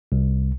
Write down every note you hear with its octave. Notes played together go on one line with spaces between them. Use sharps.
C2